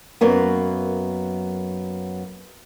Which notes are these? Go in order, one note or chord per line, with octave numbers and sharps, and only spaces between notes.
F#2 F#3 A#3 B3